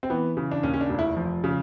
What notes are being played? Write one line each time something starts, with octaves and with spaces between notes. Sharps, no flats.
C4
E3 B3
C#3
D4
D#2 C#4
C#4
D4
F1
E4
F3
C#3